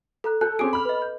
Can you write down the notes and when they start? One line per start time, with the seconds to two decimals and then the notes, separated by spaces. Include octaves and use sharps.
0.24 A4 A#5 F#6
0.41 A4 F#6 G6
0.59 C4 C#4 G#4 A4 D6 D7
0.73 B5 F6
0.85 B4 D#5
1.02 G6